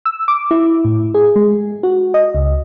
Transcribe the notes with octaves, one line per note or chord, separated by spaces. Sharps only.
E6
D6
E4
A2
G#4
G#3
F#4
D#5
C#2